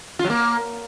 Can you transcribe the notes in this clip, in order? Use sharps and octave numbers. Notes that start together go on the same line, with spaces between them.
F4
F#3
A#3